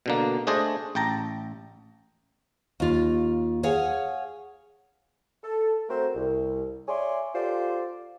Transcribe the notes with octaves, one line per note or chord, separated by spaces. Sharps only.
B2 D3 A#3
A3 D4 G#4 C5 D5 D#5
A1 G5 A5 A#5
D#2 F4
G#4 C#5 F5 F#5 G#5
A4
A3 C4 F#4 A#4 C5
C2
C#5 D5 E5 G#5 C6
F4 G4 A4 C5 D5